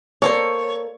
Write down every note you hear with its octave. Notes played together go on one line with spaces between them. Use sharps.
A#3 A4 C5 C#5